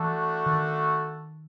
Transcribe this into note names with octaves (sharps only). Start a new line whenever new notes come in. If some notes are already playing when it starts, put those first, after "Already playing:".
Already playing: E3 A3 D4 F#4 A4
D#3